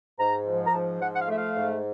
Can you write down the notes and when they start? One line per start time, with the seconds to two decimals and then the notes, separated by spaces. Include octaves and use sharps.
0.19 G#2 A#5
0.46 F3
0.66 A#5
0.73 G#2 A5
1.01 F3 F#5
1.15 F#5
1.22 F5
1.28 A3 E5
1.37 F5
1.56 G#2